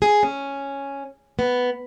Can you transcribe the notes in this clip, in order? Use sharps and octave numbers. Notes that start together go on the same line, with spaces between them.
G#4
C#4
B3